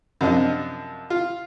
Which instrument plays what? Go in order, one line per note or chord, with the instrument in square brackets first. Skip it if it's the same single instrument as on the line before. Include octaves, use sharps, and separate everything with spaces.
[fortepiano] F#2 C3 F3 D4 D#5
F4